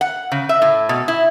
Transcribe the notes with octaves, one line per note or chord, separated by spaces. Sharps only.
F#5
C#3
E5
A2
B2
E4